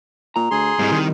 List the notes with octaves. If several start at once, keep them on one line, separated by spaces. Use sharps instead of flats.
A#2 A#5
D2 G#4 C6
C2 G#2 G#3
D#3 A#4